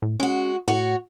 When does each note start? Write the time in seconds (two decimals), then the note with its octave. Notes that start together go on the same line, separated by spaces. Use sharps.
0.02 A2
0.20 G#3 C#4 F#4
0.68 A2 F#4 C#5